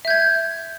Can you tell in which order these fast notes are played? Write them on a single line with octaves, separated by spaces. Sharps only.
E5 G6 G#6